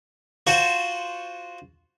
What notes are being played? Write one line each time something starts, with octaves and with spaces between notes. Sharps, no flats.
F4 F#4 C5 A5 C6 C#6